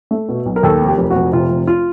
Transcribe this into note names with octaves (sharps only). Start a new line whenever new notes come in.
A3
B2
B1
A#4
D#2 A4
F1
G4
F1
F1 F#4
C3 F4
F1
F4